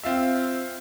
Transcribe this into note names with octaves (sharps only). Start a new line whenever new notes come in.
C4 F4 E5